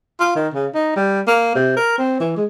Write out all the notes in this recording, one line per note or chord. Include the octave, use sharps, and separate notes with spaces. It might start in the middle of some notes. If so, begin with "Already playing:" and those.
F4
D#3
C#3
D#4
G3
A#3
C3
A#4
C4
E3
G#3